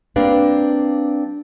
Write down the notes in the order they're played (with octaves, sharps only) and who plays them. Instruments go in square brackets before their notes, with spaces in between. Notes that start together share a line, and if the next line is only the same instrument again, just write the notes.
[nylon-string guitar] G3 A#3 C4 D4 B4 F5